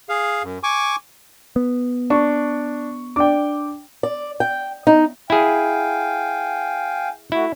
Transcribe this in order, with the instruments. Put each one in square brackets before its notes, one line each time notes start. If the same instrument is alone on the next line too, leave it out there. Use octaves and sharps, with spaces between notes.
[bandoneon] G#4 F5
F#2
G#5 C#6 D6
[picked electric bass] B3
[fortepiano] D4 [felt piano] C#6
[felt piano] D4 D5 [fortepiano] G5 D6
[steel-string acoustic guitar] D5
G5
D#4
[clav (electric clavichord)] E4 G#4 [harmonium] F5 G5 G#5
[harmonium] A3 F#4 [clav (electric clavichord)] E4